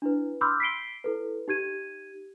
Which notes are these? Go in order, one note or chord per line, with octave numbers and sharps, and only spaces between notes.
D4 E4 B4
B5 C6 D6 E6 F6 G6
B6 C7 D7 G7
E4 A4 B4
D#4 G4 G#6 D#7